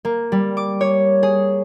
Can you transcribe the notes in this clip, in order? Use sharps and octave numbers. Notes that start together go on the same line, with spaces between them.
A#3
G3
D6
C#5
G#4